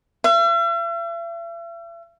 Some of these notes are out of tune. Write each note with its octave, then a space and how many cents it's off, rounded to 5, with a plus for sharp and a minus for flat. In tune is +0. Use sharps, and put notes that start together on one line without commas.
E5 +45